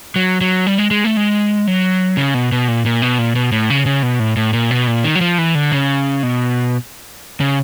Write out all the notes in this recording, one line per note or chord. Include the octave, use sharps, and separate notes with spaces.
F#3
F#3
G3
G#3
G#3
A3
G#3
F#3
C#3
B2
B2
A#2
A#2
B2
A#2
B2
A2
C#3
C#3
B2
A2
A2
A#2
B2
A#2
D#3
F#3
F3
E3
D3
C#3
B2
C#3